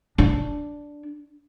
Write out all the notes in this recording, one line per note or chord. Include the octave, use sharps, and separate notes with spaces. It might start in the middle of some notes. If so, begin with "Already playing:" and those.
D4